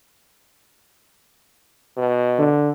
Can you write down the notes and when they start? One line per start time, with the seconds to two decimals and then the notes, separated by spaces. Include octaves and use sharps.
1.97 B2
2.39 D3